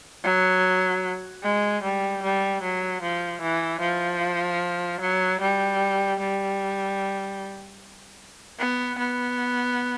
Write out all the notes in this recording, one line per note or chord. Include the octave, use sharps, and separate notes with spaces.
F#3
G#3
G3
G3
F#3
F3
E3
F3
F#3
G3
G3
B3
B3